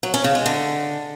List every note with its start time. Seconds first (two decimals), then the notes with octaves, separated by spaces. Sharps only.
0.03 F#3
0.14 C#4
0.24 C#3
0.35 G#3
0.46 D3